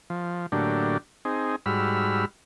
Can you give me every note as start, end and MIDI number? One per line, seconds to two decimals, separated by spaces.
0.10 0.46 53
0.52 0.97 45
0.52 0.97 50
0.52 0.97 54
0.52 0.97 58
0.52 0.97 62
0.52 0.97 67
1.25 1.56 60
1.25 1.56 63
1.25 1.56 68
1.66 2.25 44
1.66 2.25 55
1.66 2.25 66
1.66 2.25 83
1.66 2.25 88
1.66 2.25 89